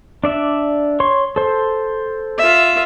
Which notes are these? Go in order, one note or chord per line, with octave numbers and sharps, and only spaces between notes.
D4 D5 E5
C#5 C6 C#6
A4 C5
F4 E5